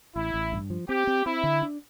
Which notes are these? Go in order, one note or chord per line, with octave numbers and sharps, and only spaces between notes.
A1 E4
A1
G2
F3
C4 G4
C4
C4 E4
D3
D4